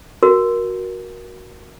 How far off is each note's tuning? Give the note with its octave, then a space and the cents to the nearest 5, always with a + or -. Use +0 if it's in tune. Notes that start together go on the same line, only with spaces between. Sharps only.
F#4 +0 A#4 +15